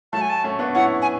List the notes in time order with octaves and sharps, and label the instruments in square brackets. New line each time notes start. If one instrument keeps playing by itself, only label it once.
[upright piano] F#3 A3 [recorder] A5
[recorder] G#5
A5
[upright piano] A3 C#4
B3 D4
[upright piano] C#4 E4 [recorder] F#5
[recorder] G#5